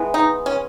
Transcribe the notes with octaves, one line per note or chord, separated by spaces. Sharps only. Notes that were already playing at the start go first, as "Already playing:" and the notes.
Already playing: E3 G#3 B3
D#4
C#4